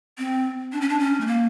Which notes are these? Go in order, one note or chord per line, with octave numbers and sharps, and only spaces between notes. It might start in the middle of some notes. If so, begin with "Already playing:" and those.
C4
D4
C#4
D4
C#4
A3
A#3